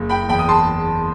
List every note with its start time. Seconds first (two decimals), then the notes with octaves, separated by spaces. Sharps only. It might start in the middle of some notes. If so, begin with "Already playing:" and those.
Already playing: F#1
0.09 G5 B5
0.29 E2 G5 B5
0.39 D#6
0.49 A5 C6